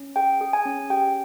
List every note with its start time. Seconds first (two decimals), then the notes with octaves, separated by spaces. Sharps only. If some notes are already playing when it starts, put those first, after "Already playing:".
Already playing: C#4
0.16 G#4 G5
0.41 G#4
0.53 G#5
0.65 C#4
0.90 G4 G5